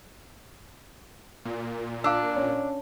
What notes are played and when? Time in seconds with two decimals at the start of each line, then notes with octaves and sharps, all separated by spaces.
1.45 A#2
2.04 D4 F5 D6 E6
2.36 C#4